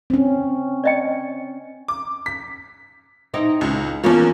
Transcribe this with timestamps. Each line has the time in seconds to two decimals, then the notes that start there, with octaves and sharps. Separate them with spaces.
0.10 C4 C#4
0.84 D5 D#5 G5
1.88 D6
2.26 B6
3.34 C4 D#4 E4
3.61 C#2
4.04 E2 F3 A#3 C#4 F4